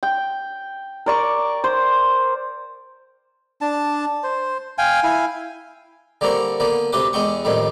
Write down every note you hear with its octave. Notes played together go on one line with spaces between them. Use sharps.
G5
A#4 D5 C#6
C5
D4 A5
C5
F5 G5 G#5
E4 F5 G#5
D3 G3 A#3 C4 A#5 C#6
D3 A#3 B3
D2 C3 G4 B4 D6
E2 G#3 B3 G5 C#6
F2 A2 D#3 G3